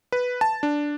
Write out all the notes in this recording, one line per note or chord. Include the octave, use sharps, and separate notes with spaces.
B4
A5
D4